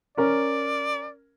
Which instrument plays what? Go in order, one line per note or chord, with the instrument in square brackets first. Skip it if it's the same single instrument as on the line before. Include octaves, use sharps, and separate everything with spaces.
[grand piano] C#4 A#4 [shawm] D5